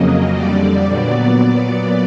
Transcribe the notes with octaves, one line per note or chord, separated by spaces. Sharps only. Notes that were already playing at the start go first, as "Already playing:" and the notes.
Already playing: F2 C#3 F#3 A#3 D#5
F2 D3 G3 D5
A#2 F#3 B3
A#2 F#3 B3